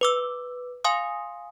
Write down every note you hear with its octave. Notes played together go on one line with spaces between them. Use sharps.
B4 D6 E6
F5 G#5 C6 D#6